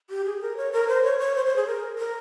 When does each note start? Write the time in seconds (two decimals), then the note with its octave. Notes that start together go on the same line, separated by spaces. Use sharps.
0.10 G4
0.25 G#4
0.41 A#4
0.57 C#5
0.72 A#4
0.88 C5
1.04 C#5
1.19 C#5
1.36 C5
1.46 C5
1.56 G#4
1.67 A#4
1.98 A#4